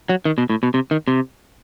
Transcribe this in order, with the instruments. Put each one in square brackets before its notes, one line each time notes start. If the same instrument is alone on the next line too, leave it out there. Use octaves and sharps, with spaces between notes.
[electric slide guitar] F#3
D#3
B2
A2
B2
C3
D#3
C3